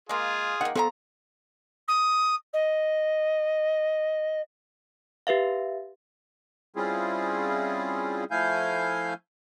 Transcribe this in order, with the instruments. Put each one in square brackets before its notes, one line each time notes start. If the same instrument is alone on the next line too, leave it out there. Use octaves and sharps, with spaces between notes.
[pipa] G#3 A#3 [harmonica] F4 G#4
[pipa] D#3 A#3 [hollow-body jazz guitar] F#5
[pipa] F3 C4 A#5 [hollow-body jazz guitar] B3 A4
[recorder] D#6
D#5
[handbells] G4 B4 E5 F5
[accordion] G3 C4 C#4 E4 F4 G#4
F3 A3 E4 F5 G#5 G6